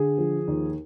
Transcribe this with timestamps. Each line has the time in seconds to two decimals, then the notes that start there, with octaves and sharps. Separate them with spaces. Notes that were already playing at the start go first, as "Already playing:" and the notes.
Already playing: D3 G#4
0.18 F3
0.47 D#2